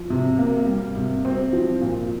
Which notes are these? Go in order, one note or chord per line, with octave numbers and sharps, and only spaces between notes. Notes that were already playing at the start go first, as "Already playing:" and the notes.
Already playing: F3
C3
A#3
G3
C3
C4
F3
A#2